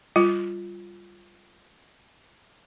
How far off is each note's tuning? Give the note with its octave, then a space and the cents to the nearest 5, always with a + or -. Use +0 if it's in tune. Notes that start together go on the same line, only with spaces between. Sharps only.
G3 +0 F4 +0